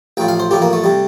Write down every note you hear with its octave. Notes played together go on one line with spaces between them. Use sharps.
A1 A2 F3 G5
F5
C5
A1 A2 F3 G4
A#3
A3
C3 G3